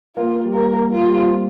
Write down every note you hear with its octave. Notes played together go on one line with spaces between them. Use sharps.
A#3 F4
A#3
G3
A#3 A#4
A#3
A#3 F4
G3
C4